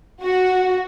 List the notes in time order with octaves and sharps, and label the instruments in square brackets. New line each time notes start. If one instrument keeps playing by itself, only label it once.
[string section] F#4